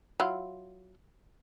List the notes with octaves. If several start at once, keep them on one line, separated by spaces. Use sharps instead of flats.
F#3 E4 F4